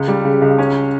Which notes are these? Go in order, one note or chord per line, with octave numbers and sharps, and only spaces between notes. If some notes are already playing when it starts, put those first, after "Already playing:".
Already playing: C#2
G3
C#3
C#2
C#4